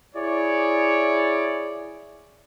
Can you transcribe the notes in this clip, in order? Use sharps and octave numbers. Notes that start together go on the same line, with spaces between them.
E4 G#4 C#5 D5